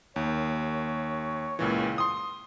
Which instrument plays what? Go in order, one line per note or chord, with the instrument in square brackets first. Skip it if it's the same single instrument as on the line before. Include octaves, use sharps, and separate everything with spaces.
[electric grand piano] D#2 [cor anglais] C#5
[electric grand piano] C#2 A#2 E3
C6 D#6